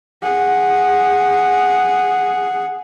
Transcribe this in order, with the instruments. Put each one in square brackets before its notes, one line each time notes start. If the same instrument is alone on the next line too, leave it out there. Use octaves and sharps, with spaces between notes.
[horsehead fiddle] G#4 F#5